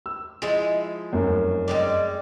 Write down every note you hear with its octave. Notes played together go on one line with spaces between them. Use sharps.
E6
F3 G#3 E4 G#4
F1 F#2
G3 G#3 D5